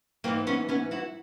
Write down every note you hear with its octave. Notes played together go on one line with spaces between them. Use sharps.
G#2 E3 A#3 C4
B3 C#4
B3 C#4
E4 F#4